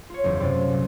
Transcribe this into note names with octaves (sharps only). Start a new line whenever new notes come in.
F4 C#5
F#1 E2
F#2 C3 F4 D5
F#3 A3
C2 A#2